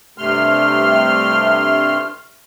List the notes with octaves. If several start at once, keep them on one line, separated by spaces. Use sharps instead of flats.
G2 C3 A3 C6 F6